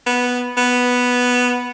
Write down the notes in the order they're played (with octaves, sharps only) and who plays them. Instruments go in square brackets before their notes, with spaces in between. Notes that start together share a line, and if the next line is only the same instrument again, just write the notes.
[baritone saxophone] B3
B3